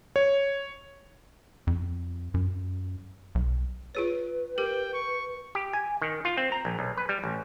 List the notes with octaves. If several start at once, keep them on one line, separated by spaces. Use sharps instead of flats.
C#5
F2
F#2
B1
F4 G#4 B4 C#5
G4 A#4 G5
C#6
G4
G#5
D#3
F4
C4
A#5
A#1
B1
B4
G3
A1